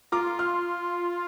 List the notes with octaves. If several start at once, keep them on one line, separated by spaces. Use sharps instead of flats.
F4 A#5 D6
C6 F6